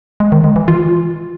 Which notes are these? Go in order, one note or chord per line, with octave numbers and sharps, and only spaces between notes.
G#3
D#3
G#3
E3
F4